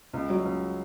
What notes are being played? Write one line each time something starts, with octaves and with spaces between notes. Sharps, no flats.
C#2
F#3
C#2